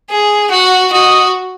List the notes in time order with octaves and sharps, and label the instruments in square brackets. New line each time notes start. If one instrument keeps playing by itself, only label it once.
[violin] G#4
[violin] F#4 [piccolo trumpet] F#5
[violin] F#4 [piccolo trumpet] D#5